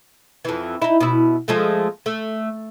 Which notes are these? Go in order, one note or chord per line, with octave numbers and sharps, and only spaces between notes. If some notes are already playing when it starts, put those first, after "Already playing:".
F2 E3
D#4 E4
B2 E4
F3 G#3 A3
A3